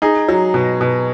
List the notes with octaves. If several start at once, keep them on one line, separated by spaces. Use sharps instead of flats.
D#4 G#4
F#3
B2
B2